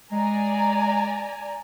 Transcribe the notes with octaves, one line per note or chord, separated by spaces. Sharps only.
G#3 D5 G#5 A#5